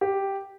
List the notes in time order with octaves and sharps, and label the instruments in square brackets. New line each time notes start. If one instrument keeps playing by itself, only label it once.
[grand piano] G4